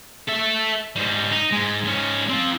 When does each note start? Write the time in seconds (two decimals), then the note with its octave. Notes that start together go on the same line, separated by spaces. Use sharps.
0.29 A4 E5
0.96 G#2 G3
1.32 D#4
1.52 G#2 G#3
1.84 G#2 C#4
2.28 C4 F4